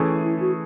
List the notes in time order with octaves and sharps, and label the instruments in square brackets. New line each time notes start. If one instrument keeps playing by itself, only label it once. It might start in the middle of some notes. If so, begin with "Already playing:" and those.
Already playing: [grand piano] E3 A3 C#4 G#4
[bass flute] E4
E4
F#4